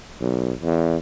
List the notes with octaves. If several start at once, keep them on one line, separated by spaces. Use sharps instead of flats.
B1
E2